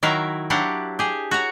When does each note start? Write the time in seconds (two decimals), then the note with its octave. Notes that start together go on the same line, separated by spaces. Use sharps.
0.03 D#3 F#3 E4 A#4 E5 F5
0.50 F#3 D4 E4 G4 F5 F#5
0.99 G4 G#4
1.31 F#4 C#5 A#5